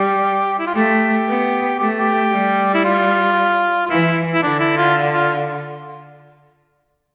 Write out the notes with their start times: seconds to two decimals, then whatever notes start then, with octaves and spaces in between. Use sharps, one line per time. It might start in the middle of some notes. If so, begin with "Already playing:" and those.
Already playing: G3 G4
0.59 E4
0.67 F4
0.75 A3 G4
1.28 B3
1.79 A3 G4
1.99 G4
2.33 G3
2.74 E4
2.85 F4
3.86 F4
3.90 E3 E4
4.34 E4
4.43 D3 D4
4.60 E4
4.77 F4
5.13 F4